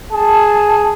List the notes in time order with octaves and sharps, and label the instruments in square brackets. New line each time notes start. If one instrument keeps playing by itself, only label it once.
[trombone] G#4 [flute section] A5